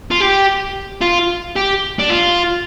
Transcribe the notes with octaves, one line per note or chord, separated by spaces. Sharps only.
F4
G4
F4
G4
D4
F4